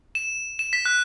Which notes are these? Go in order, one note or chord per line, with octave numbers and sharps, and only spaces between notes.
E7
E7
B6
F#6